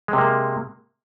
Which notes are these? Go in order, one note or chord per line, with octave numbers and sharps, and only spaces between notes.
C3 G#3 A#3